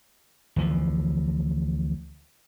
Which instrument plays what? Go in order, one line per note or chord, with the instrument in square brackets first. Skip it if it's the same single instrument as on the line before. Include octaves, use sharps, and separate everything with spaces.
[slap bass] D2 E3 F3